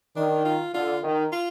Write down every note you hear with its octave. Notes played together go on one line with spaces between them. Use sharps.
D#3 D4
F4
D3 F4
D#3
F4